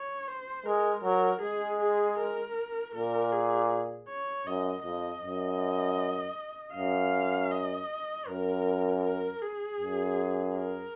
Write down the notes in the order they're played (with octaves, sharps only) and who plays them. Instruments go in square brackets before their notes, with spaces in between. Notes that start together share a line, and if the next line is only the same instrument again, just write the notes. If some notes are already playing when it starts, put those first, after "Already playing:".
Already playing: [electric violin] C#5
C5
[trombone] G#3 [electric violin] A#4
[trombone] F#3 [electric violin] A#4
[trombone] G#3 [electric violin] G#4
[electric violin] G#4
A#4
[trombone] A#2 [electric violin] A#4
[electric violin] G#4
C#5
[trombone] F#2 [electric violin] D#5
[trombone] F2 [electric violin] D#5
[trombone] F#2
[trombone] F#2 [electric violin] F5
[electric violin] D#5
[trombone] F#2 [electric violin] A#4
[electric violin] A#4
G#4
[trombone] F#2
[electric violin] A#4